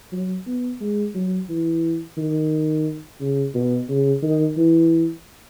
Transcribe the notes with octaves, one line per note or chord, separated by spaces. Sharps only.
F#3
B3
G#3
F#3
E3
D#3
C#3
B2
C#3
D#3
E3